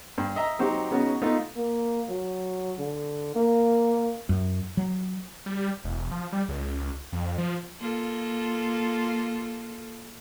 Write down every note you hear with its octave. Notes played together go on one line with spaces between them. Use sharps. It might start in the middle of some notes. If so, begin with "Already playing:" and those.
G2
D#5 E5 A#5
F#3 C4 D#4 F#4 G4
C#3 B3 C#4 D#4 F#4
A3 B3 D#4 F4
A#3
F#3
D3
A#3
F#2
F#3
G3
E1
F3
G3
C#2
F2
F3
A#3 F4 A4